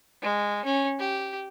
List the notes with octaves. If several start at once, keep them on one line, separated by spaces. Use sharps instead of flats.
G#3
C#4
G4